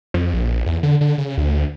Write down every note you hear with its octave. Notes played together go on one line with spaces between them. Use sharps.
F2
A#1
E2
D3
D3
C#3
D2